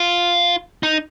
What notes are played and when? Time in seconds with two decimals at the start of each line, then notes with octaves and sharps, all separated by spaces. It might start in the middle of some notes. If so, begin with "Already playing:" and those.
Already playing: F4
0.83 D#4